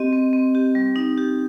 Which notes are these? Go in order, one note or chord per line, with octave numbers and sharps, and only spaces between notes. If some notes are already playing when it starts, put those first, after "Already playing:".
Already playing: C4 G4 D#5
C4
C4
G4
G3
D#4
G4